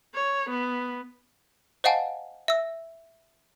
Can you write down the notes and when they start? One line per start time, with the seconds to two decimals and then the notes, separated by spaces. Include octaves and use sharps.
0.14 C#5
0.50 B3
1.84 C5 D#5 F5 F#5 G#5 A5
2.48 E5 E6